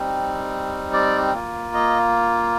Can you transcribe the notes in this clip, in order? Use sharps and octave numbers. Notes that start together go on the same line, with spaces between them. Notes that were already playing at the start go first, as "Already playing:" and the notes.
Already playing: G3 C4 D#4
D5
A#3 F4
D#5